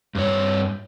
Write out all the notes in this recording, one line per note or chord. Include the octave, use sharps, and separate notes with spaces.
G2 C#5